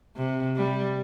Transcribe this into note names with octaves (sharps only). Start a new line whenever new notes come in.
C3
G3